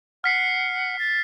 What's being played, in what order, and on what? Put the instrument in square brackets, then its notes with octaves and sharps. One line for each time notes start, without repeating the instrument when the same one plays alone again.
[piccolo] F#5 [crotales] F6 B6 C7
[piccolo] A6